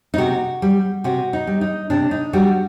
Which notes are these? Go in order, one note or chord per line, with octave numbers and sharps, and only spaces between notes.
D#4
C3 F#4
G3
C3 F#4
D#4
G3
D#4
C3 D4
D#4
G3 F#4